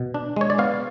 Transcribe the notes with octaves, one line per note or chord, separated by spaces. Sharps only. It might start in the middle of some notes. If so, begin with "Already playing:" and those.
Already playing: B2
D4
G#3 C#5
D5
B3 F5